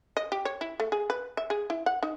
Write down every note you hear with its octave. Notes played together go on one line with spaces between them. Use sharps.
D#5
G4
C#5
E4
A3
G#4
B4
E5
G#4
E4
F#5
D#4